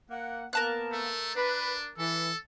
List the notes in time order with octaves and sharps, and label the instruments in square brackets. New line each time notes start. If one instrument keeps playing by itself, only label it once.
[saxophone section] A#3 F#5
[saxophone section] A#3 B3 [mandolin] A#4 A5 F#6
[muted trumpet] A3
[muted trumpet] D4 [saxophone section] B4
[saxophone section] E3 [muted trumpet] A4